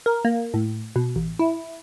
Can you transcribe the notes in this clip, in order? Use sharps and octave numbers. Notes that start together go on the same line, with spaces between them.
A#4
A#3
A2
B2
A1
E4